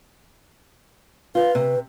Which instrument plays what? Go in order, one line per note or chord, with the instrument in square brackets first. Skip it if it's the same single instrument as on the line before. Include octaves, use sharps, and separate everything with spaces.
[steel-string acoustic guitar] F4 [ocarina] B4
[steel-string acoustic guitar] C3